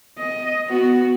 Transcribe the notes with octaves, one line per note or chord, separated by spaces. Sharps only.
D#5
B3 F#4